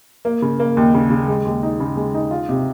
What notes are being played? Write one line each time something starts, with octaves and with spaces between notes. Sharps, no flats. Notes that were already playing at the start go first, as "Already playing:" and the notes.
A#3
C#3
A#3
D#2
C#3
C#3
G#3
D#2
D#4
C#3
G#3
D#4
F4
C3